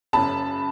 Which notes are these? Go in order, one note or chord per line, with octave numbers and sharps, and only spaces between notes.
F#1 F#2 C#3 A5 B5